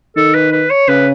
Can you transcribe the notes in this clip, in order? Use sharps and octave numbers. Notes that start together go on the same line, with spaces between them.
D#3 A4
B4
B4
C#5
C#3 B4